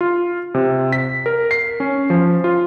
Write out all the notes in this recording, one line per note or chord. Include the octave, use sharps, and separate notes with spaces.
F4
C3
B6
A#4
C7
C#4
F3
F4